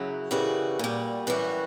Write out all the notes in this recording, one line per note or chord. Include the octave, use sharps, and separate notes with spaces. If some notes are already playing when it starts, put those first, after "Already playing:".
Already playing: F#2 C#3 F#3 E4
F#2 C#3 E3 G3 F#4
A#2 G3
F#2 E3 G3 F#4